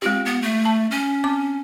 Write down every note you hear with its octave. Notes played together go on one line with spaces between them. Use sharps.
G#3 C4 F4 G4
B3
A3
A5
C#4
C4 D6